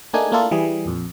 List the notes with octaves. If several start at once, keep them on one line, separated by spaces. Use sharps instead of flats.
A3 A#3 D4 D#4 G#4 G#5
A3 A#3 D4 E4 F4 A4
E3 G3 G#4
A#1 F2